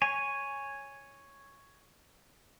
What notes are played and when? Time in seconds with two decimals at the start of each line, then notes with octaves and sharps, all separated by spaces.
0.02 C#5 G#5